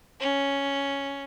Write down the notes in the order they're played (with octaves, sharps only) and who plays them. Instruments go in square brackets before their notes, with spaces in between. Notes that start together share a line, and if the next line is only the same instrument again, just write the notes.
[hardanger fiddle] C#4